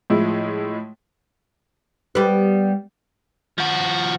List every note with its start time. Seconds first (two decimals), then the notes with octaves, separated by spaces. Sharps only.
0.10 A2 F3 G#3 E4
2.15 G3 B3
3.58 F3 F#4